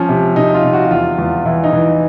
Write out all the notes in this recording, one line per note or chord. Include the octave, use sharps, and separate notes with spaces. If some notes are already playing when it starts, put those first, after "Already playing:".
Already playing: F3 C#4
C3
C3 D#4
F4
C3
F#4
F#4
E2 F4
E2
E3 E4
D#4
E3